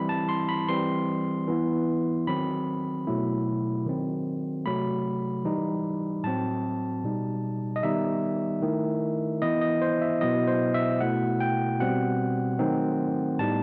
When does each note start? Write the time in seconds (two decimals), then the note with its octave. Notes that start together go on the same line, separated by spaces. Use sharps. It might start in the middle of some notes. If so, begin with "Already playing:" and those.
Already playing: E3 G3 C4 E4 B5
0.09 A5
0.29 C6
0.49 B5
0.69 E3 G3 C4 C6
1.48 E3 B3 E4
2.27 D#3 F#3 C4 B5
3.07 B2 F#3 A3 E4
3.86 D#3 F#3 C4
4.66 C3 F#3 A3 B5
5.44 E3 G3 D#4
6.24 A2 F#3 C4 A5
7.04 B2 G3 D#4
7.76 D#5
7.83 D#3 G3 B3 D#4 E5
8.62 D#3 A3 E4
9.42 E3 B3 E4 D#5
9.61 D#5
9.82 C5
10.02 E5
10.21 B2 F#3 B3 E4 D#5
10.48 C5
10.74 E5
11.01 B2 A3 E4 F#5
11.40 G5
11.80 B2 G3 C4 F#5
12.59 D#3 F#3 A3 C4 D#4
13.39 A2 G3 B3 D#4 A5